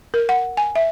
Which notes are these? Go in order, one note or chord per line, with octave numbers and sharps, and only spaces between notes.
A#4
F#5
G#5
E5